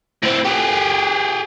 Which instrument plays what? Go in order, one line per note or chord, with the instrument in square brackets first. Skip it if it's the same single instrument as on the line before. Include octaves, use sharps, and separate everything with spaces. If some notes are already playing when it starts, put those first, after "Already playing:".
[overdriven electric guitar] A2 C4
G4 G#4